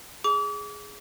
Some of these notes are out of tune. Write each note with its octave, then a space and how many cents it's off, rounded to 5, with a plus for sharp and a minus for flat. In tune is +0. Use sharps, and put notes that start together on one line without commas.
G#4 +0 D6 -35